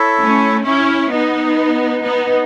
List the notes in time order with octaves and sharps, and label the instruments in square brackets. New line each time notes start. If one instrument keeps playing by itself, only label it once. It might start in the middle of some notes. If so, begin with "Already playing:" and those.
Already playing: [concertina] E4 A4 C#5 E5
[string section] A3 C#4
C#4 E4
B3 D#4
B3 D#4